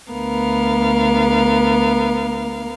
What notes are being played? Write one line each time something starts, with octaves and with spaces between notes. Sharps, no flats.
D2 B3 A#4 F5